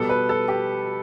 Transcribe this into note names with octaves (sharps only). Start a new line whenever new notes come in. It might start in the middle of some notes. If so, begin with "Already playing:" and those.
Already playing: B2 G3 B3 A4
B4
A4
G4